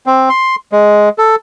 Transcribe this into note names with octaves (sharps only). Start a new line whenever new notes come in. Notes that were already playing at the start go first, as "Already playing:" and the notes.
C4
C6
G#3
A4